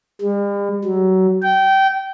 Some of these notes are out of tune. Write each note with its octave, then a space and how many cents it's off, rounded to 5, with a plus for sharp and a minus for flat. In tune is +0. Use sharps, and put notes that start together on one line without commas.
G3 +45
F#3 +25
G5 -20